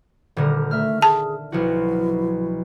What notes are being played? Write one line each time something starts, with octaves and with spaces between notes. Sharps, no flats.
D#1 D3 A#4
A3 E5 F6
G#4 A5
B1 F3 E4 F#4